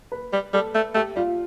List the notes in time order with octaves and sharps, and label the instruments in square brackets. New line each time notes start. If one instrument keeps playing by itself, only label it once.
[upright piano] B4
[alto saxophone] G3
[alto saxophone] G3 [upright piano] A4
[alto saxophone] A3
[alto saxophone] A3 [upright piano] G4
[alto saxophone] G3 [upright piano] F4